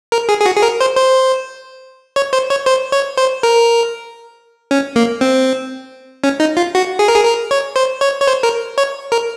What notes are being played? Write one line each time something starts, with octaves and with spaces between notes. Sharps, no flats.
A#4
G#4
G#4
F#4
G#4
A#4
C5
C5
C#5
C5
C#5
C5
C#5
C5
A#4
C#4
A#3
C4
C#4
D#4
F4
F#4
G#4
A#4
G#4
A#4
C#5
C5
C#5
C#5
C5
A#4
C#5
A#4